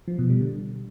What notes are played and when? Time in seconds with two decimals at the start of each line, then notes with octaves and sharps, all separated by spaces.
0.08 F3
0.19 B2
0.30 G3
0.41 D3